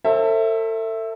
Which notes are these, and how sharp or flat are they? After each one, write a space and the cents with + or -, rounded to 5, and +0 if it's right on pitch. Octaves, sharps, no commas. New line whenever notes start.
A4 +35 C5 +35 E5 +0